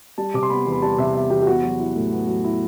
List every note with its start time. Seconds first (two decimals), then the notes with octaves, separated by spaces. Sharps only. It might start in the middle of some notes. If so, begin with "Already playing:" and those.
0.18 G3 A5
0.34 C3 D6
0.43 C6
0.50 B3 B5
0.66 E2
0.72 B5
0.82 G3 A5
0.98 C3 E5
1.14 B3 E5
1.30 E2 G4
1.42 G4
1.47 B3 F#4
1.63 F#3
1.80 E4
1.95 A2
2.12 B3
2.28 F#3
2.44 E4